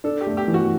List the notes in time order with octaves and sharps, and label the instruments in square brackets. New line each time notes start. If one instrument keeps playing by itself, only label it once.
[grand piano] D4 [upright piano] A4
[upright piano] G4
[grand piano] A3
[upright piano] G4
[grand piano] E3
[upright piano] F#4